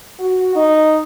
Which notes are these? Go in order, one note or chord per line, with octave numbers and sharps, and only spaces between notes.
F#4
D#4